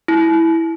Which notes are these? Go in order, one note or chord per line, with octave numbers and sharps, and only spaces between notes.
E4